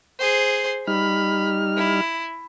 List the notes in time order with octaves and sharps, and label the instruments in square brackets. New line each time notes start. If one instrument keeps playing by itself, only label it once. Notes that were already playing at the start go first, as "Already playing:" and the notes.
[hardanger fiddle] G#4 C5
[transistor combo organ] G3 D#4 F6 [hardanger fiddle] B5
[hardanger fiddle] E4